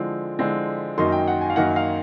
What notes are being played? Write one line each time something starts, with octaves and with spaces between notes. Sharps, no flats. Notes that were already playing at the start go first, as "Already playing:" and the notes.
Already playing: D3 F3 G#3 C4 E4
D3 F3 G#3 C4 E4
F#2 D#3 F#3 A#3 D#4 C6
G5
F#5
G#5
F5
F#2 D#3 F#3 A#3 D#4 F#5
F5